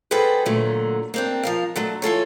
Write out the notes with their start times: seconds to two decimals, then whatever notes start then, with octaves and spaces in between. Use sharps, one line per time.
0.11 G3 F#4 G#4 A4 B4 C5
0.46 A#2 D3 F#3 A3
1.14 A#3 C4 D4
1.43 F3 A#4 F5
1.76 D3 F#3 A3
2.02 E3 F4 A4 C#5